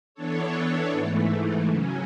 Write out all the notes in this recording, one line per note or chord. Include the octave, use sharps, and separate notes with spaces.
E3 B3 D4 A4 C#5
G#2 E3 A3
C#3 F#3 C#4